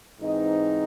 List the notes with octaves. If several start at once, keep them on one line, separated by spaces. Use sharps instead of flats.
G#2 E3 C4 D#4 D#5